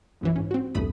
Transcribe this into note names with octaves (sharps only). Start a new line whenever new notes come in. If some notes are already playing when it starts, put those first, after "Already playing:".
B1 F#2 E3
G#2 C#4
C4 F#4
B1 E2 G2 A3 B5 D#6